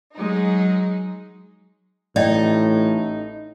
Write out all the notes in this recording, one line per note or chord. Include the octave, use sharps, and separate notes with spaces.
F#3 G#3 D#4
A1 A2 D#4 D5 D#5 G5